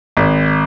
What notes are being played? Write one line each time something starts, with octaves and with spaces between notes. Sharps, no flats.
G#1